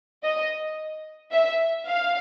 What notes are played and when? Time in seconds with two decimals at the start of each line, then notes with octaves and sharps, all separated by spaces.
0.24 D#5
1.32 E5
1.87 F5